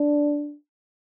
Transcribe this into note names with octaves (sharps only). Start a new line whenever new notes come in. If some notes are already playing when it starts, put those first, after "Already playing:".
Already playing: D4